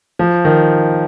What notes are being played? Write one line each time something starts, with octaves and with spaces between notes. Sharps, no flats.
F3
D#3